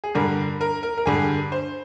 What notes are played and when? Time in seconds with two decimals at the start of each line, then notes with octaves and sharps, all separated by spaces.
0.04 G#4
0.15 G2 D3 G3 A#4
0.61 A#4
0.83 A#4
0.98 A#4
1.06 G2 D3 G3 G#4
1.52 C5